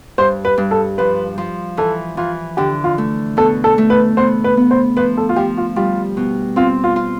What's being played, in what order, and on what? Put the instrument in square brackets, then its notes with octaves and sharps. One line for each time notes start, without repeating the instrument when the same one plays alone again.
[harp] G2 [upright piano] C5
[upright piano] B4
[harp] G2
[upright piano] A4
[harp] F3 [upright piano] B4
[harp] F3
[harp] E3 [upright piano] A4
[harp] E3 [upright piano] F4
[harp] D3 [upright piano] G4
[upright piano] F4
[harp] A3
[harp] B2 [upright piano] A4
[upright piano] A4
[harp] A3
[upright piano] B4
[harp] B3 [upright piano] C5
[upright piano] B4
[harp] B3
[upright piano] C5
[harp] F3 [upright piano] B4
[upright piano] A4
F4
[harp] F3 [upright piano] G4
[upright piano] F4
[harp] G3 [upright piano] F4
[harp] B2
[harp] C4 [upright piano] F4
[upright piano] F4
[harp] F4